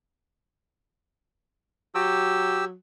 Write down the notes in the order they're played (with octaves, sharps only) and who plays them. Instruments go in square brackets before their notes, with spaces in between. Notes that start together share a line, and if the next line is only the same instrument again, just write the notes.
[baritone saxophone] F#3 [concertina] G4 E6